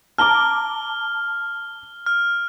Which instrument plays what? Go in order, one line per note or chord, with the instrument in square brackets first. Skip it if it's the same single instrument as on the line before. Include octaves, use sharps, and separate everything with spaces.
[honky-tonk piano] A5 A#5 D6 [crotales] F6 G7
[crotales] F6